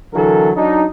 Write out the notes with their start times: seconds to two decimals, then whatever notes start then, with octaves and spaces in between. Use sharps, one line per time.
0.13 D3 E3 F#3 A4 A#4
0.56 F#3 D4 D#4